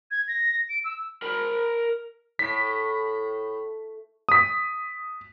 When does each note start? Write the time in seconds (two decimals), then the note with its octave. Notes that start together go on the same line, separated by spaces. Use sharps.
0.11 G#6
0.28 A#6
0.69 D7
0.85 E6
1.22 A#4 B5
2.39 A2 B6
4.29 D#6 B6